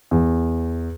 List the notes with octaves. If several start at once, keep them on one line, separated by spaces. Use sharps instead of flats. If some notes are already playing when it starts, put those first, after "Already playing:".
E2